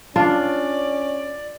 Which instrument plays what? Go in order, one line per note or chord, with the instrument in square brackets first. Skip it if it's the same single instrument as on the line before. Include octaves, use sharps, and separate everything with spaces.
[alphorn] C#4 [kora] D4 F4 [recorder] D5